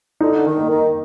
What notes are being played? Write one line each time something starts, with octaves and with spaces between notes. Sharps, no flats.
D3 D#4
D#3
A#3
D#3